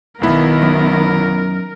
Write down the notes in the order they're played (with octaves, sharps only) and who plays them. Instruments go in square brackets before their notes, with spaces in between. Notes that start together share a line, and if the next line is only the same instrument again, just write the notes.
[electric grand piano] B1 E4 [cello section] D#3 B3 [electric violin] A#4
[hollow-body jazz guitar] F#2